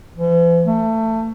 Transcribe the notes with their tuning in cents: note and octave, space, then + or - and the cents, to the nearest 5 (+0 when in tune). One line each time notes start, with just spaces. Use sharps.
E3 +45
A3 +25